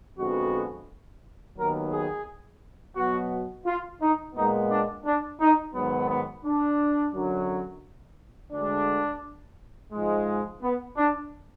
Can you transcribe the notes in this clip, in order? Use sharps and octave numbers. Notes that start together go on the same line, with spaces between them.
F2 D3 G#3 B3 F#4
D#2 D#3 F#3 B3 A#4
G#4
B2 F#3 B3 F#4
F4
D#4
A#2 G#3 B3 D#4
D4
D4
D#4
G#2 D#3 F#3 B3
B3
D4
F#2 D3 F#3
D2 D3 G#3 D4
G#2 F3 G#3
B3
D4